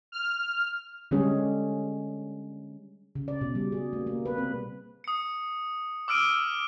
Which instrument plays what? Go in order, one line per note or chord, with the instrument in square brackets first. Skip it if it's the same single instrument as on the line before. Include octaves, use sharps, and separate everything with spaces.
[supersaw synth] F6
[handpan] D3 G3 G#3 C#4 G#4
C#3
D5
B2
G3
G#4
A#3
A#3
B4
C4
[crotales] D#6 C#7
D6 E6 F6 D7 D#7